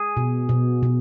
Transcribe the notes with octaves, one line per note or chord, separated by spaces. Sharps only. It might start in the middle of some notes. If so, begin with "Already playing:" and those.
Already playing: G#4
B2
B2
B2